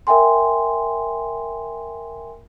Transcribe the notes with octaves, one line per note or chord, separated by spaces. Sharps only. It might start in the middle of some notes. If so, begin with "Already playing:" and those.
A#4 E5 G5 G#5 C6